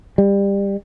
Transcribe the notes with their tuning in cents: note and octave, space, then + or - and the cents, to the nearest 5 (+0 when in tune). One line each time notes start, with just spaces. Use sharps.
G3 +25